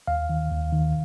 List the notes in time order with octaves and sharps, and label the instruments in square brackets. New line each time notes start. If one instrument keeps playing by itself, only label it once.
[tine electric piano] D#2 F5
D#3
D#2
D#3